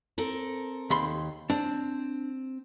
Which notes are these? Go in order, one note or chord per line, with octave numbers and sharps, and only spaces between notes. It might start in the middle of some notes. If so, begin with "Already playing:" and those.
C4 A4 A#4
D#2 B5 C6
C4 D4